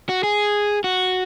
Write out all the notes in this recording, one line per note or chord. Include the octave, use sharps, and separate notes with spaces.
F#4
G#4
F#4